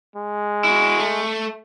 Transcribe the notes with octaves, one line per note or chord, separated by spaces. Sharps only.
G#3
E4 F#4
A3